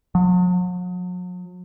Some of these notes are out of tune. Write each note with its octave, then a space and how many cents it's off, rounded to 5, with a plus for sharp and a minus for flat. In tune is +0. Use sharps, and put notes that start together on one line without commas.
F#3 -45